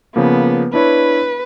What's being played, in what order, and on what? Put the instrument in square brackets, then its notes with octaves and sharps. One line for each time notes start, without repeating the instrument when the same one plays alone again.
[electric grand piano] C#3 F3 A#3 [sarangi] B3
[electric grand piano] D4 E4 C#5 [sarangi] B4